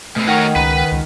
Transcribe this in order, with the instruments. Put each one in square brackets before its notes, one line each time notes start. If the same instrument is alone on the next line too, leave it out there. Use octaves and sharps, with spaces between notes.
[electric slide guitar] B2 C4 [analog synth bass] A3
[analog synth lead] D#3 [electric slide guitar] F#3 A#4 C#5 [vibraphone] F#5 G5
[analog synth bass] C#2 [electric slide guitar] B4
[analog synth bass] C#2